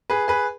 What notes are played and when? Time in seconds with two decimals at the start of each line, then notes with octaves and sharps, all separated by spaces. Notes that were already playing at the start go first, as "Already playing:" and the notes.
0.10 G#4 B4
0.28 G#4 B4